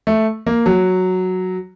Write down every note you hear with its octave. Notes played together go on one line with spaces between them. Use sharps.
A3
A#3
F#3